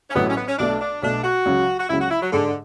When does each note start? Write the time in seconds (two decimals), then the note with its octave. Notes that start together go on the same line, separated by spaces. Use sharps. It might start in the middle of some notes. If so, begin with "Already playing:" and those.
0.10 C#4
0.15 A1 A2 F#3 B3
0.29 C#4
0.37 B3
0.48 C#4
0.58 B1 B2 A3 D4
0.81 D4
1.02 B1 B2 A3 D4
1.24 F#4
1.46 C#2 C#3 F#3
1.78 F#4
1.89 C#2 C#3 F#3 E4
2.00 F#4
2.11 E4
2.22 F#3
2.32 G#2 D3 G#3 D4 A4